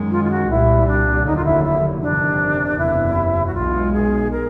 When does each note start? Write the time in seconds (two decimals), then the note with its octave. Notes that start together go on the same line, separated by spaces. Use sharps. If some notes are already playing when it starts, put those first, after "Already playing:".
Already playing: F#2 D#3 G#3
0.11 F4
0.24 F4
0.31 F#4
0.49 C2 A#2 G3 E4
0.87 D4
1.26 F1 D#2 D3 F#3 D#4
1.36 F4
1.45 E4
1.64 E4
2.02 G1 F2 C3 D#3 D4
2.78 F#1 E2 C3 E4
3.47 F#4
3.54 B1 B2 G#3 F4
3.93 G#4
4.31 A#4